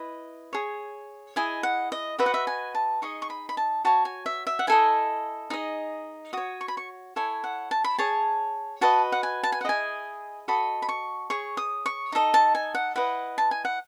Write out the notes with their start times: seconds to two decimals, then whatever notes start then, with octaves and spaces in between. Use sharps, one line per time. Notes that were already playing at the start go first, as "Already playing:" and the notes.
Already playing: E4 B4 D#5
0.53 G#4 C#5
1.36 E4 G#4 D#5 G#5
1.63 F#5
1.92 D#5
2.18 F#4 B4 D#5 E5
2.26 F#5
2.34 E5
2.47 G#5
2.75 A5
3.02 D#4 G#4 D#5 C#6
3.22 C#6
3.30 B5
3.49 B5
3.57 A5
3.85 F#4 C#5 A5
4.05 G#5
4.26 E5
4.47 E5
4.59 F#5
4.67 E4 A4 D#5 G#5
5.50 D#4 G#4 D#5
6.33 F#4 C#5 D#6
6.61 C#6
6.68 B5
6.77 C#6
7.16 E4 A4 C#5 G#5
7.44 F#5
7.71 A5
7.84 B5
7.98 G#4 C#5 A5
8.81 F#4 B4 D#5 A5
9.12 F#5
9.23 G#5
9.43 A5
9.52 G#5
9.61 F#5
9.65 E4 G#4 D#5 G#5
10.48 F#4 A4 D#5 B5
10.82 B5
10.89 C#6
11.30 G#4 C#5 C#6
11.57 D#6
11.86 C#6
12.12 D#4 A4 D#5
12.34 A5
12.55 G#5
12.74 F#5
12.95 E4 B4 D#5 F#5
13.38 A5
13.51 G#5
13.65 F#5